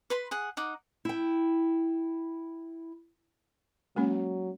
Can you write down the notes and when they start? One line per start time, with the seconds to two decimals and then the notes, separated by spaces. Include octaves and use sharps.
0.10 B4 B5 C6
0.31 G#4 F#5
0.57 D#4 F#5 D6
1.05 E4 G5
3.96 F#3 G#3 A#3 C#4